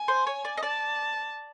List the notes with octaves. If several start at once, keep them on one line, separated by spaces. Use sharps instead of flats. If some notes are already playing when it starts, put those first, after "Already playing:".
Already playing: G#5
C5
C#5
D5
D#5
D5 A5